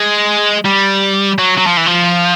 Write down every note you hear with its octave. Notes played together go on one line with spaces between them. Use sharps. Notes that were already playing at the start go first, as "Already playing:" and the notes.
Already playing: G#3
G3
F#3
F#3
F3
E3
F3